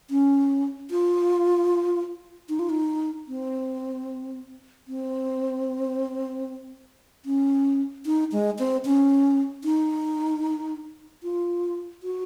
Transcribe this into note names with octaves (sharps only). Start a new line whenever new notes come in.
C#4
F4
D#4
F4
D#4
C4
C4
C#4
D#4
G#3
C4
C#4
D#4
F4
F#4